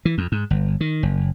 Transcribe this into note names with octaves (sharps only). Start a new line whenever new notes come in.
E3
F2
G#2
G1
D#3
F#1